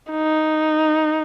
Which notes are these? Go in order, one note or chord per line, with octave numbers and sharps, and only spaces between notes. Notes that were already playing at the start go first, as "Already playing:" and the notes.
D#4